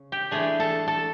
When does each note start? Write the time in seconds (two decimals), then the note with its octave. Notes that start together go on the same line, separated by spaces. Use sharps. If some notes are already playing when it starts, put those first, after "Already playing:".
Already playing: C#3 C#4
0.12 G4
0.31 E3 A3 D4 G#4
0.60 A4
0.88 A4